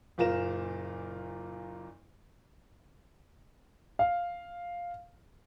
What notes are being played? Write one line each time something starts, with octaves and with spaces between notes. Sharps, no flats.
F#1 A#2 F4 A#4 A#6 E7
F5